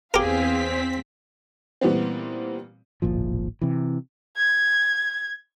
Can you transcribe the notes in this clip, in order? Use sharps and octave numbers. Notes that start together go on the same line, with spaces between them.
E2 C4 G4 G#4 A#4 F5 B6
A#2 E3 G3 B3 C4
D1 G#1 A#2 F3
C3 E3
G#6